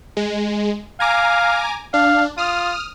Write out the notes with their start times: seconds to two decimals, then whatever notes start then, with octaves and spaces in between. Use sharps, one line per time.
0.17 G#3
1.00 F5 G#5 A#5 D6
1.94 D4 F5
2.38 F4 D#6 F6